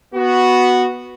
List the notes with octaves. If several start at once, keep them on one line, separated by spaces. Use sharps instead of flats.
B3 F#4